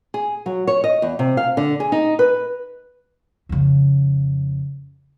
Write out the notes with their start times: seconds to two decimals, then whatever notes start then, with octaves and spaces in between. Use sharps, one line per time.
0.14 G#4
0.46 F#3
0.67 C#5
0.84 D#5
1.02 E2
1.19 C3
1.37 F5
1.57 D3
1.80 G#4
1.92 D#4
2.19 B4
3.49 F2 C#3